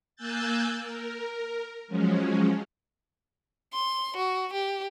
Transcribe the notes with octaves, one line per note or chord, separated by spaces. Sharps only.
A#3 G#5 E6 F#6 G6 A6
A#4
F3 F#3 G#3 C#4
C6
F#4
G4